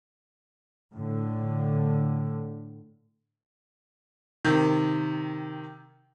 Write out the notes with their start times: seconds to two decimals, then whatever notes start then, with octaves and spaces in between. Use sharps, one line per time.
0.94 A2 D3
4.45 C3 D#3